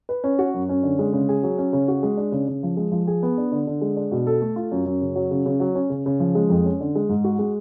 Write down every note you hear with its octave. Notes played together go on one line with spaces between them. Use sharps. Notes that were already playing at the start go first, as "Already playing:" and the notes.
B4
C#4
F#4
F#2
C#4
D3
G#3
C#3
G#4
F#3
C#4
C#3
F#4
G#3
D4
C#3
C#3
F3
G#3
F3
G#4
B3
D4
D3
D3
G#3
D4
B2
A4
A3
F4
F#2
F#2
C#3
F#3
C#3
C#3
F#3
C#4
C#3
C#3
F3
G#3
F2
C#4
D3
G#3
G#2
F#4
G#3